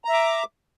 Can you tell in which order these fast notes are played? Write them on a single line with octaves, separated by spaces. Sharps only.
A#5 E5 D6